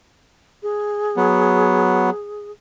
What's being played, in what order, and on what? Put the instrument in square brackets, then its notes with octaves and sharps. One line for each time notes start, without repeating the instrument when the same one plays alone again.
[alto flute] G#4
[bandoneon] F#3 B3